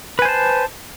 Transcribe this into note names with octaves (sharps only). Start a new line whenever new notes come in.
B4 C5 G#5 A5